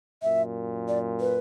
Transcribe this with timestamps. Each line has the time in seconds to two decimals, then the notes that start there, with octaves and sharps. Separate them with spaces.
0.23 F#2 A#2 E5
0.88 D5
1.20 B4